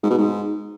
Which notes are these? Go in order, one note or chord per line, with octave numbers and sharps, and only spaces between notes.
G#2
B2
G#2